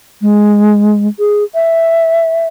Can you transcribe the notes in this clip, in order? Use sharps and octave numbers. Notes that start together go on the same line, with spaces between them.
G#3
G#4
E5